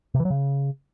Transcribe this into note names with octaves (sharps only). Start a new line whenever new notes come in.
C3
E3
F#3
C#3